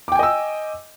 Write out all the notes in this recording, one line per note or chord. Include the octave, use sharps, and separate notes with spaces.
D#5 G5 G#5 D6 E6